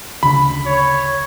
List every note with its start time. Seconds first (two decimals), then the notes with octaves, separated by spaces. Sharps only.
0.23 D2 C#3 B5
0.66 C#5